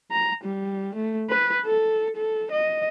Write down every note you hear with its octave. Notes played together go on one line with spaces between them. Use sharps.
A#5
G3
A3
B4
A4
A4
D#5